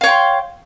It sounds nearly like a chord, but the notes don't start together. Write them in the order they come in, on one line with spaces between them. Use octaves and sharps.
F5 C#5 G5 C6